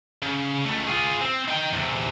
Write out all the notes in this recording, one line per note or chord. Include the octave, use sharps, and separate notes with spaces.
C#3
C#2 A3
F4 G#4
C4
D#4 G5
E2 C3